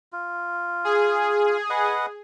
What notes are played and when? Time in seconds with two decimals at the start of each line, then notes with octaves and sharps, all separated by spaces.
0.13 F4
0.84 G#4
1.70 B4 D#5 F#5